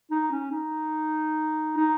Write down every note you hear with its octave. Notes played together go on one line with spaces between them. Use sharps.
D#4
C#4
D#4
D#4